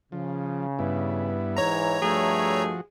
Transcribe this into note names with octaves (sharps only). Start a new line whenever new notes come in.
C#3 F3
G2 B3 E4
G#2 E3 C#5 A#5
G2 F3 A3 F#4 G#4